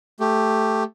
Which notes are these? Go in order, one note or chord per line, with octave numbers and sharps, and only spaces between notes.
A3 G4